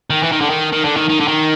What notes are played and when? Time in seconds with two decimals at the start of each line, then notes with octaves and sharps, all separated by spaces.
0.10 D#3
0.23 E3
0.32 D#3
0.41 D3
0.50 D#3
0.72 D#3
0.84 D3
0.97 D#3
1.10 D#3
1.20 D3
1.28 D#3